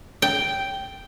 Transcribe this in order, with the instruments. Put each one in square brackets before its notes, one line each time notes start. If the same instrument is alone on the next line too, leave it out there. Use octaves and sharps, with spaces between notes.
[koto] G5